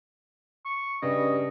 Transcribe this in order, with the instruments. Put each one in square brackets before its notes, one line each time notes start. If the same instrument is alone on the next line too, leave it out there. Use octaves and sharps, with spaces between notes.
[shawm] C#6
[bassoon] G2 [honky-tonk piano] C#3 [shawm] D#5